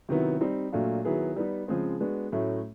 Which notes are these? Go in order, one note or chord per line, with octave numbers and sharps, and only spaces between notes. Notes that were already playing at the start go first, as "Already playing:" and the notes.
C3 D#3 F#3 B3 E4
G3 C4 D#4
A#2 F#3 A3 D4 F4
D#3 F#3 B3 E4 G#4
G3 B3 D#4
C#3 F3 G#3 C4
G#3 B3 D4 F#4
A2 F#3 A3 C#4